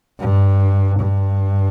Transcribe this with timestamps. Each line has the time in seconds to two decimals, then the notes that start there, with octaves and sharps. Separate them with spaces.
0.20 G2
0.99 G2